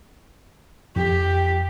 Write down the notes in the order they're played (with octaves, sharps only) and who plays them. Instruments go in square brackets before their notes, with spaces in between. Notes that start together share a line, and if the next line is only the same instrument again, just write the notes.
[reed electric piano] F2 [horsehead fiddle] G4